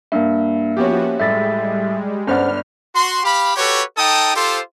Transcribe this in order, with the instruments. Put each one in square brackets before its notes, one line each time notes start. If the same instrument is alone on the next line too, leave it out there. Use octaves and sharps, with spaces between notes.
[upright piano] G2 [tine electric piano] A#3 E5
[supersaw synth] F3 B3 F#4 [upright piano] C#4 G4
[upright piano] A2 [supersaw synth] G3 G#3 [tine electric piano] E5 A6 B6
[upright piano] G1 B3 D4 [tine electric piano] C#4 C5 F#5 [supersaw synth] F6
[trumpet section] F#4 C6
G4 F5 B5
F#4 G4 A4 B4 C#5
D#4 A4 G5 A5 D#6
F4 G4 A4 C5